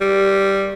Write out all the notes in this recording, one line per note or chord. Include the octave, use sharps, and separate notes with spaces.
G3